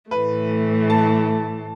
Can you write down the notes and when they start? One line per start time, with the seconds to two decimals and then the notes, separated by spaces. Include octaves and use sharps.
0.11 A2 E3 A3 B4
0.90 A5